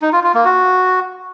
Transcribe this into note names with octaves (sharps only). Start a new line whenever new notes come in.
D#4
F4
F4
A#3
F#4